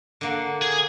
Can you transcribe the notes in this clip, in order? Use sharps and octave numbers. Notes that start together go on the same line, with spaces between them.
D3 A#3 F#5
G#4